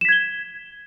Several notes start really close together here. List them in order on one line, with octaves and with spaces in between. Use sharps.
E7 B6 G#6 G7